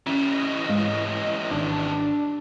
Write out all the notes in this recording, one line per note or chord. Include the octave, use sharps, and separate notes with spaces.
E3 G3 C#4
D#5
G#2 G#3
G#1 D#3 D4